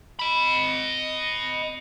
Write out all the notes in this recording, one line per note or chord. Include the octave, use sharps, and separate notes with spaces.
D#5 B5